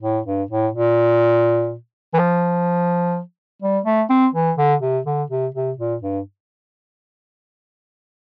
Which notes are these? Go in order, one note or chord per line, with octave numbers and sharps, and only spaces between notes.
A2
G2
A2
A#2
E3
F3
G3
A3
C4
E3
D3
C3
D3
C3
C3
A#2
G2